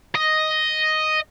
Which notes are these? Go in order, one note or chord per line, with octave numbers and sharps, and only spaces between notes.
D#5